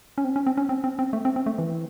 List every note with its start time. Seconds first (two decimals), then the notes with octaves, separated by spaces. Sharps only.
0.18 C#4
0.24 C4
0.36 C#4
0.47 C4
0.57 C#4
0.69 C4
0.84 C4
0.99 C4
1.13 A3
1.25 C4
1.36 C4
1.46 A3
1.58 E3